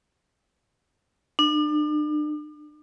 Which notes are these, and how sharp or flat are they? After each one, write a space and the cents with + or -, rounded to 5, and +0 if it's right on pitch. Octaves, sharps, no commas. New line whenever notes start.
D4 +40